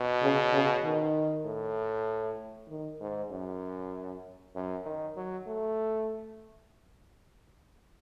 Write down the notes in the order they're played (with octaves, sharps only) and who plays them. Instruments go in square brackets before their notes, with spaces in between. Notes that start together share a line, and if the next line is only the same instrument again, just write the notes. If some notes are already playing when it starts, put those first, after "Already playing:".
Already playing: [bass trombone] B2
[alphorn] C#3
C#3
D#3
[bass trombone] A2
[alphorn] D#3
[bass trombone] G#2
F#2
F#2
D#3
F#3
A3